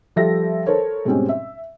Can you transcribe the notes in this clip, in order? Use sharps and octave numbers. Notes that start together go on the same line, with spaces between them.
F3 G3 A4 E5 A#6
A4 A#4 C5 C#5
G#2 B2 G3 C4 C#4
E5